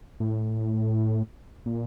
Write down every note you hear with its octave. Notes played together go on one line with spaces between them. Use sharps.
A2
A#2